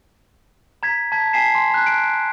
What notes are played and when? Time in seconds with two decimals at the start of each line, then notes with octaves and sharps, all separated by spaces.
0.83 A#5 G#6 B6
1.12 A5 G#6 B6
1.33 G#5 A5 B6 C7 E7
1.55 G#5 C6
1.71 A#5 F#6
1.86 D7